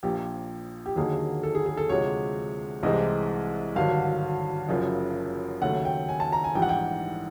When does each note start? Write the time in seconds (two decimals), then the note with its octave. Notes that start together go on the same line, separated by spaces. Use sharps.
0.03 A#1 A#2 F3 G4
0.86 G4
0.96 D#2 D3 F#3 A#3 D#4 G#4
1.43 A4
1.55 G#4
1.66 G#4
1.77 A4
1.89 D2 C3 F3 G#3 C#5
2.83 C2 C3 E3 G#3 C4 D#5
3.75 G#1 G2 D3 F#3 F5
4.69 F#1 F#2 C#3 F3
5.62 D#2 C#3 F#3 A3 F#5
5.85 G5
6.09 G#5
6.20 A5
6.33 A#5
6.44 G#5
6.55 A#1 G#2 E3 G3 G5
6.62 F#5
6.69 G5